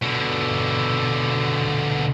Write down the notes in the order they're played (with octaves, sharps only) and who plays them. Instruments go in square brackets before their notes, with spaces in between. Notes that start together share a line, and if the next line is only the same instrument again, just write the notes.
[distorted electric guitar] B2 D3